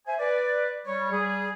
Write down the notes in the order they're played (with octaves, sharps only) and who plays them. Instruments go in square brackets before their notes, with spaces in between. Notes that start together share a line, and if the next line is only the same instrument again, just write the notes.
[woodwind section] C5 E5 G#5
B4 D5
G3 C#5
G3 G#4